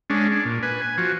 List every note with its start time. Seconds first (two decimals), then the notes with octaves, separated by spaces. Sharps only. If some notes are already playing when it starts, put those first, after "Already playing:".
0.10 G#3 C#4 D4
0.32 D4
0.45 A#2
0.63 B4 G#5
0.82 G#5
0.98 F3 F#4